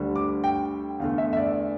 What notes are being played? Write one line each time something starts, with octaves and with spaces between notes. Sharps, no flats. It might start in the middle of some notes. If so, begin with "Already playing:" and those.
Already playing: D2 D3 G3
D6
G5
E2 D3 A3 F5
E5
E5
D5